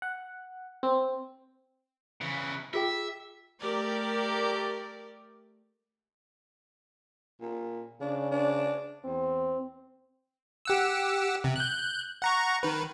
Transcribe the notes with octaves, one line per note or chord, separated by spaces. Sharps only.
F#5
C4
C#3 E3
F4 G#4 E5 G5
A3 G4 A#4 D5
A#2
C#3 D4
D4
E2 C4
G4 F#5 E6
C3
F#6 G6
F#5 A#5 C#6
D#3 B4